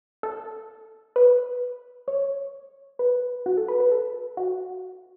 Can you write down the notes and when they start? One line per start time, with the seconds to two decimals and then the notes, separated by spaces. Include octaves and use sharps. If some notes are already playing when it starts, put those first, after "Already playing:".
0.23 A4
1.16 B4
2.08 C#5
2.99 B4
3.46 F#4
3.57 A4
3.68 B4
3.80 B4
3.92 A4
4.37 F#4